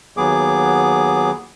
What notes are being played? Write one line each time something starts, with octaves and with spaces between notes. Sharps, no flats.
D#2 F#3 B3 G#4 D6